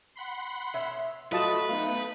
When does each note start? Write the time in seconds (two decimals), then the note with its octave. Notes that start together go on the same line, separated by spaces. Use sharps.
0.16 F#5 B5 C6
0.74 B2 C#5 E5
1.32 F#3 A3 F4 F#4 B4 D#5 A5
1.69 A3 B3 D#4 F5